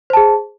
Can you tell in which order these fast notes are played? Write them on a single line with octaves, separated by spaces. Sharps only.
C5 A5 G#4